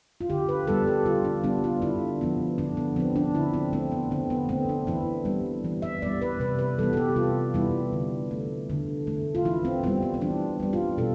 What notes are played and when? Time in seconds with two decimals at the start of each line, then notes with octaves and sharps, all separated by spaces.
0.21 F4
0.30 D3 G4
0.49 B4
0.67 G3 B3 A4
0.87 G4
1.06 D3 F4
1.25 D4
1.44 G3 B3 D4
1.64 F4
1.82 D3 E4
2.21 F3 B3
2.58 D3 D4
2.77 B3
2.96 F3 B3 C4
3.16 D4
3.35 D3 E4
3.53 C4
3.73 A3 C4
3.92 B3
4.11 D3 C4
4.30 B3
4.49 A3 C4
4.69 D4
4.87 E3 E4
5.25 G3 B3
5.64 E3
5.82 E5
6.02 G3 B3 D5
6.22 B4
6.40 C3 B4
6.59 B4
6.78 E3 G3 B3 A4
6.93 A4
6.97 G4
7.16 C3 F4
7.54 E3 G3 B3 E4
7.93 D3
8.31 A3
8.70 D3
9.07 A3
9.35 F4
9.45 E3 E4
9.65 C4
9.83 G3 B3 C4
10.03 C4
10.14 C4
10.21 E3 D4
10.60 G3 B3
10.73 F4
10.98 B2 A4